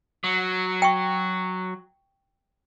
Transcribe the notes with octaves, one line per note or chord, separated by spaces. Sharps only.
F#3
G5 C#6